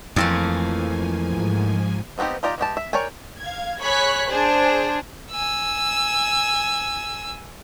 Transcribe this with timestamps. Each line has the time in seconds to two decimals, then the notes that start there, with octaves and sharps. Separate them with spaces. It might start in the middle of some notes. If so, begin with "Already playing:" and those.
0.16 F2 E3 F3 A3 A#3 G#5
1.31 G#2
2.18 F3 B3 C4 D#4 G4
2.43 D#4 F4 G4 D5 A#5
2.58 E3 G#3 G4 A5
2.77 E5
2.93 A#4 C#5 D5 G5 G#5
3.39 F5 G#6
3.79 G#4 C#5 B5 F#6 B6
4.30 D4 G#4 C5
5.31 G#5 E6